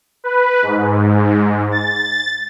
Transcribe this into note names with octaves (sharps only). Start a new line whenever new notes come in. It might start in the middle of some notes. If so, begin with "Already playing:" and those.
B4
G#2
A6